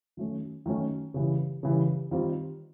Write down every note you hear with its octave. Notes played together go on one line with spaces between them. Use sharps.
D#3 F#3 A3 C#4
D#3 F#3 A3 C#4
C#3 E3 G3
C#3 E3 G3
D#3 G3 C4 F4